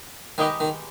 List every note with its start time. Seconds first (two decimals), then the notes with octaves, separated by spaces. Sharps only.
0.38 D#3 G#3 D#4 G4 B4 D#5
0.60 D#3